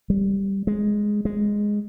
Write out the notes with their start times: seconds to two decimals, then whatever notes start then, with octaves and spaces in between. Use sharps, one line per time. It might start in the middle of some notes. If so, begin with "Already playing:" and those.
0.10 G3
0.67 G#3
1.25 G#3